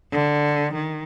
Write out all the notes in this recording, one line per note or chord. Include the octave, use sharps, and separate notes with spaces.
D3
D#3